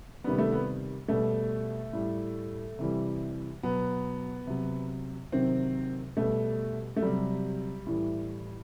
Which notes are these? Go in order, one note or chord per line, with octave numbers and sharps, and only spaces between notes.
C3 D#3 G3 B3
A3
B3
B2 G3 A3
A2 G3
C3 E3 G3
B2 F#3 B3
C3 F#3
C3 D#3 F#3 C4
B2 G3 A3
A3
C3 F#3 G3
A2 E3 G3